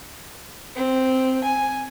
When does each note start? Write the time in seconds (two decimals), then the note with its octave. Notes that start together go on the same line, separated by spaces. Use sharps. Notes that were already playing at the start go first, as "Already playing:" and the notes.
0.76 C4
1.44 G#5